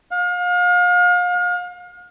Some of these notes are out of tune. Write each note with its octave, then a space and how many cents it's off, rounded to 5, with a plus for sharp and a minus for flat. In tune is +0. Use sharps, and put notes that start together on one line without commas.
F5 +35